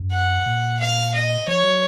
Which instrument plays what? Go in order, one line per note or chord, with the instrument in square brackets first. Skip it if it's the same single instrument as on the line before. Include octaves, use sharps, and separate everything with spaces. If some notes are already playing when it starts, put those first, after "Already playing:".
Already playing: [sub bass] F#2
[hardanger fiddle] F#5
[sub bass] A#2
[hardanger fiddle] F5
D#5
[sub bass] F3 [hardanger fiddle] C#5
[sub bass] F#3